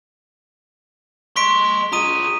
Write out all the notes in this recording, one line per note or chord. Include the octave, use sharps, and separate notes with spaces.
D#5 C6 C#6 B6 D7
F4 G#4 A#5 D#6 D#7